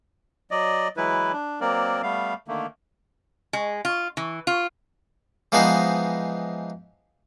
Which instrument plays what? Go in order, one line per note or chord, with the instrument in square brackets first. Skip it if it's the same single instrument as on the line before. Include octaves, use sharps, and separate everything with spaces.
[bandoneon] F#3 D5 D#5
E3 F#3 G#3 E4 B4
D4
F#3 A#3 C4 A#4 D5
G3 A3 B3 F5
D3 D#3 A3 A#3
[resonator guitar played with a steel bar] G#3
F4
E3
F4
[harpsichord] E3 F3 G#3 B3 D#4 C5